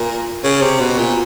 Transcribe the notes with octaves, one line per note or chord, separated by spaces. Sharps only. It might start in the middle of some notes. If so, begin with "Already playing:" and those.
Already playing: A#2
C#3
C3
B2
A#2